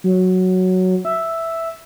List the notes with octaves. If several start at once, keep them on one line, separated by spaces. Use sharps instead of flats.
F#3
E5